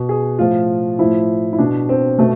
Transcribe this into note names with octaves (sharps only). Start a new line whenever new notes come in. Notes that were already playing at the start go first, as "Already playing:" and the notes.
Already playing: B2
G#4
A2 F3 F4
A2 F3 E4
E4
B2 D4
C4
B2 A3